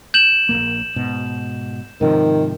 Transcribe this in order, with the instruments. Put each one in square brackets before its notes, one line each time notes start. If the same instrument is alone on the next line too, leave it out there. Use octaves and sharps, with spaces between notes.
[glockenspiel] G6 E7 F#7
[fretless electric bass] A#1 F#2 A#3
G#2 B2
[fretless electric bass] G#2 C3 F3 [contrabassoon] D#3